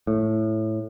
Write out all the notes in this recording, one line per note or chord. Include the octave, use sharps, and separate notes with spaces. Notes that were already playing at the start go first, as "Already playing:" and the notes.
A2